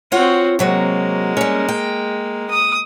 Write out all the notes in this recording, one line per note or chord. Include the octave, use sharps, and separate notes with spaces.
C4 F4 F#4 C#5 F#5
C3 F#3 G#3 A#3 F#4
G3 C#4
G5
D#6